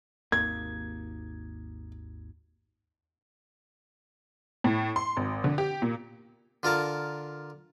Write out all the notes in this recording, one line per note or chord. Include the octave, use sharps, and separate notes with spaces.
G#1 D#2 A#3 G#6
A2
C6
G#1
D3
G4
A#2
D3 F4 A#4 A5